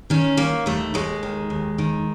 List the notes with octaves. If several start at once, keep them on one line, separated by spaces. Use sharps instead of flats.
D#3 C#4
D#3 A#3
D#2 A3
D#2 G#3
D#3
D#2
D#3